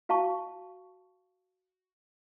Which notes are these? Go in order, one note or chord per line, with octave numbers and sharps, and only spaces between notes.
F#4 F5 A5 C#6